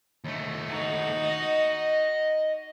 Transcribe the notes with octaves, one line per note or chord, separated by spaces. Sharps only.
D#2 A3
D#4 F#4
D#5